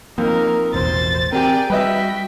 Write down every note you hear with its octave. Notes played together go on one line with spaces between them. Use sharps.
F2 A#3 D#4 A#4
A1 E2 B2 C5 A6
C4 G4 G#4 A#4 D5 G5
G3 F#4 B4 D#5 E5 B6